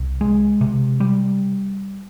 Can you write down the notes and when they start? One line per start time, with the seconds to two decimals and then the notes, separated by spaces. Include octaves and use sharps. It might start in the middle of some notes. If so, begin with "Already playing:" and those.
Already playing: C2
0.21 G#3
0.61 C3
1.00 G3